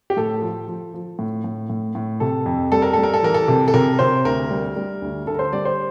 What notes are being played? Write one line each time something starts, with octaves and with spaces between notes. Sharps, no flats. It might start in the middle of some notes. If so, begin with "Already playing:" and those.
G4
A2 A4
F3
F3
F3
A2
A2
A2
A2
C3 A4
F2
G3 A4
A#4
G3 A4
A#4
A4
E3 A#4
A4
C3
A4
C3 A#4
C3 C5
D2 A#4
G3
G3
D2
D3 A4
A#4
C5
G3 D5
C5